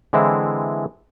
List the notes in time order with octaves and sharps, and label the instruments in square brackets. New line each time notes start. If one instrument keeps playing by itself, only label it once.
[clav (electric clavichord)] D3 E3 G#3 C4 E4